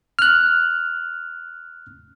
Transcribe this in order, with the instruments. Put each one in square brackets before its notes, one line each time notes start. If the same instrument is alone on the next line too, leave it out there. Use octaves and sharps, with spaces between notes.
[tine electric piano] F6 F#6